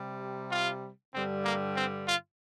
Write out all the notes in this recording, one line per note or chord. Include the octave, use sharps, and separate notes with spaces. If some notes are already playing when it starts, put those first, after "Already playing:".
Already playing: C3 G3
F4
G2 D3 G3 C4
A#3
C4
F4